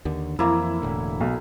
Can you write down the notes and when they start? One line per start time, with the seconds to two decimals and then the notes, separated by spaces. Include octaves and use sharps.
0.05 D#2 D3
0.39 F2 E3 A#3 E4
0.82 E1 A2 D3
1.21 B1